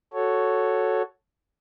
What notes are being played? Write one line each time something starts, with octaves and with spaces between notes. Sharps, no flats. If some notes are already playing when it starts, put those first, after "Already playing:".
F#4 A4 C#5